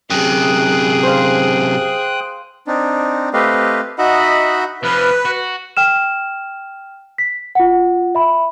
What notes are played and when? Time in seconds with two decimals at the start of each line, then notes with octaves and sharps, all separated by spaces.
0.10 F#2 C3 G#4 G5 D#6 F#6
1.03 C5 F5
2.67 C4 D4 D#4
3.33 A3 C4 G4 B4 D#5 F5
3.98 D#4 F#4 D#5 E5 F#5 B5
4.83 C3 F3 B4
5.25 F#4
5.77 G5 F6 E7
7.18 B6
7.55 F4 F#5
8.15 E5 B5